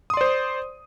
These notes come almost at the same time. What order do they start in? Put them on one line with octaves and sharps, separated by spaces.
D#6 C6 D5 C5